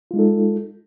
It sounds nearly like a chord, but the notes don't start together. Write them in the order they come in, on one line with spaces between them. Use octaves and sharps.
F4 G#3 D#4 A4